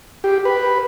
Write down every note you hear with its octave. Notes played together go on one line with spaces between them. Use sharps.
G4
B4